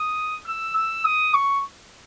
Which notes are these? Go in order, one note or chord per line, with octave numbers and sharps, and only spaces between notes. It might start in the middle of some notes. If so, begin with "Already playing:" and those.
Already playing: D#6
E6
E6
D#6
C#6